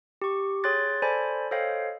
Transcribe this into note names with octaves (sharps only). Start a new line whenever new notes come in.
G4 C#6
G#4 C#5 G5 C6 F#6 A6
A4 C5 D5 G#5 A5 B5
A4 C5 C#5 D#5 F5 G5